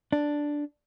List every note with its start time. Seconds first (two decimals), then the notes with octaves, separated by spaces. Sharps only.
0.12 D4